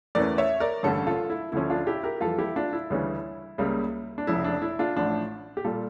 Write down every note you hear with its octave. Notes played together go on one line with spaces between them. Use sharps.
E2 E3 A3 C#4 A#4 D5
C#5 E5
A#4 D5
A1 G2 D3 G3 C#4 A4 C#5
F4 A4
E4
D2 D3 F3 C#4 E4
D4 F4
E4 G4
G4 A#4
F2 E3 G3 F4 A4
E4 G4
D4 F4
E4
D2 C#3 E3 G3 C#4
C#2 C#3 G3 A#3
D4
F1 F2 C#3 E4
D4
E4
D4 F4
A1 A2 F3 A3 D4
G4
A#2 G3 F4 A4